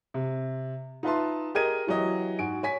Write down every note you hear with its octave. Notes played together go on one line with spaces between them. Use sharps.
C3
D#4 F4 B4 E5 A5 C6
G4 G#4 A#4 D#5 G#6 D#7
E3 F#3 G4 D#5
G#2 F#4 G#5 D7
C#5 G#5 B6